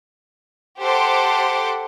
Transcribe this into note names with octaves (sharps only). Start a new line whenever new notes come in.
G4 A4 C5 F#5 C6 D6